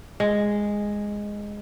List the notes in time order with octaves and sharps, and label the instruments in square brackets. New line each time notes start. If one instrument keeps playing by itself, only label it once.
[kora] G#3